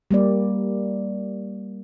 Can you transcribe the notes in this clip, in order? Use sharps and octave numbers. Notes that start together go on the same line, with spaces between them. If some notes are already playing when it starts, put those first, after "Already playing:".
G3 A#3 D5